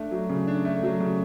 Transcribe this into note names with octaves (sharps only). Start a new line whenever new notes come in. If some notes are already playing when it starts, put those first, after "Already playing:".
Already playing: A3 D4
F#3
C#3
D4
A3
F#3
C#3